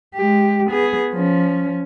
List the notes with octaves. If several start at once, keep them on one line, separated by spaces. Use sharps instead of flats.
G#3 G4
B3 G#4
F3 C#4